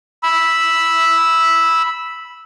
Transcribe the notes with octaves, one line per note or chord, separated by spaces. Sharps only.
B5 E6